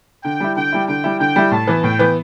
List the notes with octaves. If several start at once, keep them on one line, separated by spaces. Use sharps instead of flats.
D3 G5
G3 E4
D3 G5
G3 E4
D3 G5
G3 E4
D3 G5
G3 E4
A2 A5
E3 B3
A2 G5
E3 B3